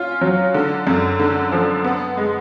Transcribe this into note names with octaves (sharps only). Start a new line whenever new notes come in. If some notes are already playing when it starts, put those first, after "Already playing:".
Already playing: C#4 F4
F#3
D3
F#2
D3
F3
B3
G#3